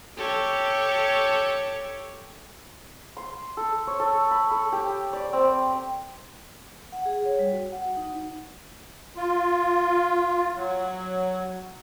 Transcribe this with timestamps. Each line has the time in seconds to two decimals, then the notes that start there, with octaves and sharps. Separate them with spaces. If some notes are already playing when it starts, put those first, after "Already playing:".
0.16 G4 A4 C#5
3.17 C6
3.57 A4
3.87 C#5
4.00 A4
4.31 B5
4.51 A4
4.72 G4
5.13 D5
5.33 C4
6.92 F#5
7.05 G#4
7.25 C#5
7.39 G3
7.53 F#4
7.72 F#5
7.97 D#4
9.16 F4
10.56 F#3